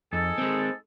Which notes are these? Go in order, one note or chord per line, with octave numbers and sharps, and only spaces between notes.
F2 D#4 G#4 A4
G#3 C4